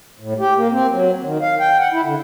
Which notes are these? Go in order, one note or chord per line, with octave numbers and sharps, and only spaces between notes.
A2
G4
A#3
C4
F#3
D#3
F5
G5
F#5
E4
D3